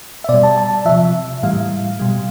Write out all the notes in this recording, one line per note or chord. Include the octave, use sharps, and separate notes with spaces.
E5
B2 G3 D5
A5
A5
C3 F3 E5
A2 E3 G3 F5
B2 G3